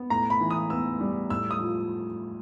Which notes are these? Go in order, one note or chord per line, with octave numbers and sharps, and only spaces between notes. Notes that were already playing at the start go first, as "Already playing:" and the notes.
Already playing: B3
A2 A#5
B5
E3
D#6
B3 E6
G3
A2 E6
D#6
F3